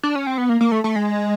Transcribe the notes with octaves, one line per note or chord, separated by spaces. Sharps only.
D4
C#4
C4
B3
A#3
A#3
A3
A3
G#3